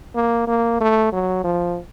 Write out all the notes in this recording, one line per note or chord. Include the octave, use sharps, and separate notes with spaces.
A#3
A#3
A3
F#3
F3